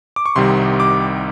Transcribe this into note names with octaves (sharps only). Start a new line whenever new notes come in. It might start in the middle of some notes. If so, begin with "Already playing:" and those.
D6
C#6
C2 C3 D#3 G3 C6
D6